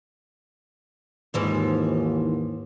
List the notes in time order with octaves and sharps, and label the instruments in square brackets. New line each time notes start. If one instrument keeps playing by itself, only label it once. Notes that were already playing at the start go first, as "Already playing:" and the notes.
[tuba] D#2 [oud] G#2 E3 F3